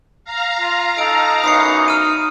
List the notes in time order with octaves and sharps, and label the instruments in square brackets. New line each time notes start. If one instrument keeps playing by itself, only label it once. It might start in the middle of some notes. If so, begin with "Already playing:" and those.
[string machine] F5 A#5
[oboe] F4
[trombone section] D#4 [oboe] A4 [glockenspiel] D7
[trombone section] F#2 E3 B3 [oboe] D#4 [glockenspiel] D#6 C7 C#7
[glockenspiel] F6 D#7